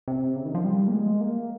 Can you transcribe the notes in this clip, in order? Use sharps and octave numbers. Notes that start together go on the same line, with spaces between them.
C3
C#3
D#3
F3
G3
A#3
G#3
A#3